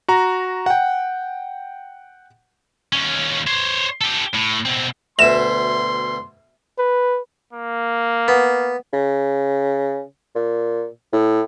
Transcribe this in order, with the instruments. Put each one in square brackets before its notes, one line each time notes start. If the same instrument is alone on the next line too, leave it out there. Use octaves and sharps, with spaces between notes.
[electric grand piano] F#4 A#5
F#5 G5
[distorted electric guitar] D#2 C#4
C5 C#5
G4 A4
A2
B2 C4
[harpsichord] D2 B2 [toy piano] E5 [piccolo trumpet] C6 [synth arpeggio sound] E7
[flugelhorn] B4
A#3
[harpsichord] B3
[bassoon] C#3
A#2
A2